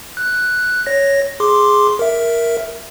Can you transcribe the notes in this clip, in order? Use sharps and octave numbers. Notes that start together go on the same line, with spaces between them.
F#6
C#5 A#6
G#4 C6 D6
A#4 E5